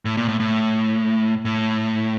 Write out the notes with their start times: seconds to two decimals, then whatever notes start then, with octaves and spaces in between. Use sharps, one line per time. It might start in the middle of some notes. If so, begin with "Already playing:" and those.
0.05 A2
0.17 A#2
0.28 A2
0.40 A2
1.45 A2